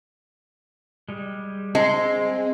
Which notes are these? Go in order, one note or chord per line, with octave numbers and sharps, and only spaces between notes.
G3 G#3
G#3 C4 C6